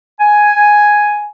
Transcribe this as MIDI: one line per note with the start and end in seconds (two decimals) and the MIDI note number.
0.20 1.28 80